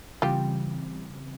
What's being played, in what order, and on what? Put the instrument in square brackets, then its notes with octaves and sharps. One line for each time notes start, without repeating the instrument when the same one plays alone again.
[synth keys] C#3 E3 G3 C4 [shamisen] F4 G4